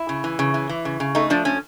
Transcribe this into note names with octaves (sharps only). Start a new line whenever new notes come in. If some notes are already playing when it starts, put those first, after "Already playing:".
Already playing: E4
C#3
E3
C#3
E3
E3
C#3
C#3
A3 D#4
F3 D4
F3 C#4